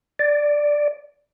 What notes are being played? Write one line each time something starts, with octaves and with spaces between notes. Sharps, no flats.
D5